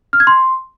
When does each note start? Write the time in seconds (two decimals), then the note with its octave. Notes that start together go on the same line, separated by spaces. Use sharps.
0.13 F6
0.20 G#6
0.27 C6